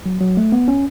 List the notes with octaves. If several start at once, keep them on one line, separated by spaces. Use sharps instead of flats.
F#3
F#3
A3
B3
C#4